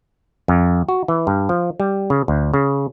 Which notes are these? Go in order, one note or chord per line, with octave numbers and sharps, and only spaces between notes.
F2
F#4
E3
G2
F3
G3
C#3
D2
C#3